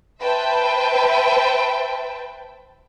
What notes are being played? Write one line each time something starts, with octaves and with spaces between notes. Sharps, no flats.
B4 C5 E5 G5 A5